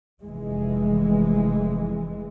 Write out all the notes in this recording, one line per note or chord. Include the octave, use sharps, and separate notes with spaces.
F1 E3 G#3